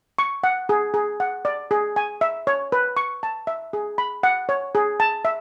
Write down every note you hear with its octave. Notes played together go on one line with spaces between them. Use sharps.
C#6
F#5
G#4
G#4
F#5
D5
G#4
G#5
E5
C#5
B4
C#6
A5
E5
G#4
B5
F#5
C#5
G#4
A5
E5